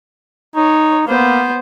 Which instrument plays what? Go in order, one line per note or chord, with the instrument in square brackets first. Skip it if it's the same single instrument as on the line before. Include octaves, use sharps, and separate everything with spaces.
[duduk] D#4 [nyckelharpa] C#5
[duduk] A#3 [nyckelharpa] B3 C5